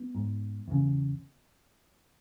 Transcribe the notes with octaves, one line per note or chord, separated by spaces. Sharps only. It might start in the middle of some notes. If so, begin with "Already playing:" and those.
Already playing: B3
G#2
E2 C#3